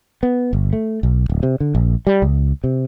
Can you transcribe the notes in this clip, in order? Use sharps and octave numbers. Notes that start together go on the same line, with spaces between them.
B3
G1
A3
B1
D1
C3
D3
A#1
G3
C#2
C3